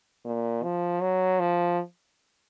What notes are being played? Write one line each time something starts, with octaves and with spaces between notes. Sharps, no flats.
A#2
F3
F#3
F3